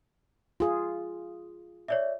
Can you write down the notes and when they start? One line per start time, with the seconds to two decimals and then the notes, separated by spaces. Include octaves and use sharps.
0.60 F4 G#4
1.88 C#5 D5 E5